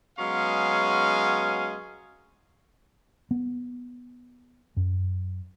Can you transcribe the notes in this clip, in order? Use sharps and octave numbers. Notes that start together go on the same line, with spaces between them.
F#3 G#3 B3 C#4 G#4 F5
B3
F#2